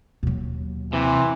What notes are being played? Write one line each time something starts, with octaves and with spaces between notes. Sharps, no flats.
D#2 B2 F#3
C3 E3